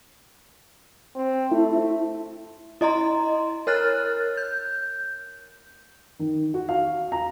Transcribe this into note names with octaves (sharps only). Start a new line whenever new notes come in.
C4
A3 E4
E4 D#5 A#5 C6
A#4 C#5 F6 F#6 A6
G6
D#3
F#4
F5
A#5